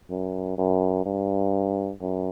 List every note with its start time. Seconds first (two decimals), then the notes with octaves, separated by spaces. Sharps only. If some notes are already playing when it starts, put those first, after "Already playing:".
0.10 F#2
0.58 F#2
1.05 G2
2.01 F#2